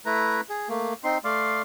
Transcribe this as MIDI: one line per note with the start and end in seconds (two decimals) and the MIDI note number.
0.06 0.41 57
0.06 0.41 64
0.06 0.41 71
0.06 0.41 82
0.49 0.69 68
0.69 0.94 57
0.69 0.94 58
1.04 1.18 60
1.04 1.18 63
1.04 1.18 84
1.24 1.62 57
1.24 1.62 74
1.24 1.62 77
1.24 1.62 84